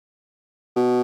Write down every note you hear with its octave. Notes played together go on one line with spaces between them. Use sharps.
B2